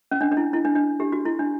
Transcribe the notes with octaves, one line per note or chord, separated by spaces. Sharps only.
C#4
D4
D4
E4
E4
D4
D4
G4
F#4
E4
D4